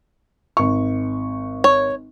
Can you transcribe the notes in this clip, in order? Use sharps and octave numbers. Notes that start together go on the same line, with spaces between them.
G#1 C#6
C#5